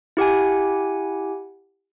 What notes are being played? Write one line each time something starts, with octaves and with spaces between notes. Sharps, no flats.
E4 G4 F#5 G#5